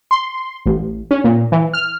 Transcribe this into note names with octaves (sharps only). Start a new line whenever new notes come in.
C6
A1
C#4
A#2
E3
F6